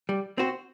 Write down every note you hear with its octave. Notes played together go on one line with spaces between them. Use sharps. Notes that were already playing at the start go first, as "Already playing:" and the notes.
G3
C4 F#4 C5